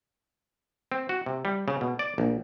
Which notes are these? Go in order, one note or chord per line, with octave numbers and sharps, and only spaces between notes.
C4
F#4
C3
G3
C#3
B2
D5
A#1